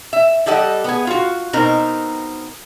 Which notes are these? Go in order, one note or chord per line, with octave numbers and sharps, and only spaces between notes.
E5
G3 G4 A4 D#5 F#5
B3 G#4
F4 F#4
B2 C4 D#4 A#4